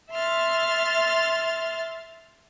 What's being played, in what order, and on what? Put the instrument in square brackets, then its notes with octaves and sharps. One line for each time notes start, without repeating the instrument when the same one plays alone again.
[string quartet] E5 C6 F6 A6